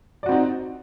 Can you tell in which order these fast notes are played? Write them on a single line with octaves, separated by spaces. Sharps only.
D5 F#4 C4 D#4